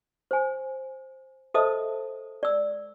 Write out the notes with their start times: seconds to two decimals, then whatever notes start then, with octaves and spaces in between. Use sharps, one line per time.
0.31 C5 G#5
1.54 A4 C5 D#5 E5 A5 D#6
2.43 D5 E6